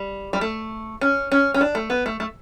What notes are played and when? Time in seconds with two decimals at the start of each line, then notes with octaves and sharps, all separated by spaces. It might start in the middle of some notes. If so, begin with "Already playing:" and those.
Already playing: G3
0.33 G3
0.41 A3
1.01 C#4
1.32 C#4
1.54 C#4
1.61 D4
1.75 A3
1.90 B3
2.06 A3
2.20 A3